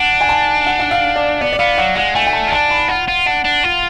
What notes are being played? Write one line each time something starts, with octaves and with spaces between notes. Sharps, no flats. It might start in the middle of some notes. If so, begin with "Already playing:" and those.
Already playing: D4 F#5
G#5
A5
F#5
F#5
F5
D5
B3 D5
D5
B3 F5
F#3 F#5
G#3 F#5
A3 G#5
G#5
A5
F4
D4 A5
B5
F4 F#5
F4
D4 F#5
D4
F4